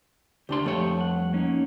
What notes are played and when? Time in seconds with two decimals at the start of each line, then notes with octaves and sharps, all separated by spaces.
0.49 D2 D4 G4 C6
0.64 F2 A3 C#5
0.99 G3 F#5
1.33 A#3 C#4 D#4